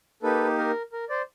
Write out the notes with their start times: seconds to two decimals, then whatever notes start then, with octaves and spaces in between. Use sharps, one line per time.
0.22 A#3 D#4 G4 A4 B4
0.58 A#4
0.93 A#4
1.09 C5 D5